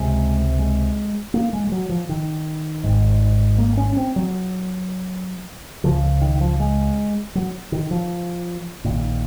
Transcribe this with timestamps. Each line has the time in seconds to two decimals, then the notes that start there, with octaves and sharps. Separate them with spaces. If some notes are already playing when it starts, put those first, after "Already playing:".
Already playing: C#2 C3 G#3
0.59 G#3
1.34 A#3
1.53 G#3
1.67 G#3
1.72 F#3
1.89 F3
2.09 D#3
2.84 G#1 G#2
3.58 A#3
3.77 C#4
3.97 C4
4.16 F#3
5.84 C#2 C#3 F3
6.21 D#3
6.41 F3
6.60 G#3
7.35 F#3
7.72 D#3
7.91 F3
8.85 A#1 A#2 D#3